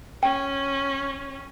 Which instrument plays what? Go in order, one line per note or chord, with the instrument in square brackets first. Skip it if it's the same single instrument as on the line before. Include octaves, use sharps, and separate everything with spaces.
[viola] C#4 [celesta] G5